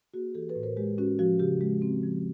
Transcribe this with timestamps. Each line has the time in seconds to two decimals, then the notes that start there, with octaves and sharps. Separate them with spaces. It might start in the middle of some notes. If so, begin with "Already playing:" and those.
0.14 A#3 F#4 G#4
0.35 E3 G4 A4
0.49 A4 B4
0.55 A2
0.63 A#4 C5
0.77 G#3 G4
0.98 C#4 F#4
1.19 F3 F#4
1.40 C#3 G4
1.61 G#3
1.82 C4
2.03 F3